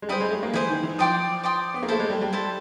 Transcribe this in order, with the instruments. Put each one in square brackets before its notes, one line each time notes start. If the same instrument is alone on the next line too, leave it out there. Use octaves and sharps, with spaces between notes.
[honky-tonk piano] G#3
[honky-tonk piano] G3 [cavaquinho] E4 G#4 C5
[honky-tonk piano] G#3
A3
A#3
[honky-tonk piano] E3 [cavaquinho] E4 G#4 C5
[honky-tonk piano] D#3
E3
[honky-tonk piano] F3 [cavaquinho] D5 G5 C6 D#6
[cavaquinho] D5 G5 C6 D#6
[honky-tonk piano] B3
A#3
[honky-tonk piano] A3 [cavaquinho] E4 A4 C5
[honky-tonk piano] G#3
G3
G3
[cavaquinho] E4 A4 C5